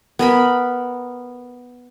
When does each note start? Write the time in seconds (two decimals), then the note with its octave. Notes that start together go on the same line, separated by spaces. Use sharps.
0.19 B3 A#4 B5